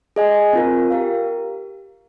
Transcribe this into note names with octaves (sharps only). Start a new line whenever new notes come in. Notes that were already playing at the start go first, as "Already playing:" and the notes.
G#4 D#5 G#5
C4 F4 A#4
G4 A#4 F5